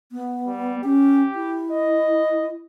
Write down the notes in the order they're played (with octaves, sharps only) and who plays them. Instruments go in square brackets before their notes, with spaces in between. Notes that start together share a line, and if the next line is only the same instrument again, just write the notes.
[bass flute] B3
[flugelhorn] G3
[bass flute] C#4 [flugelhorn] G4
[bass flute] E4
[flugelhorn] D#5